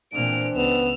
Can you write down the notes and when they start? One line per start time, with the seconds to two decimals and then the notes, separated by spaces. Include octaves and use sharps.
0.13 A#2 E3 C4 D4 F6 D7
0.56 C#2 B3 E6 F7